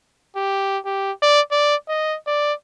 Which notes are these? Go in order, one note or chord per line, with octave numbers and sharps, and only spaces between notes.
G4
G4
D5
D5
D#5
D5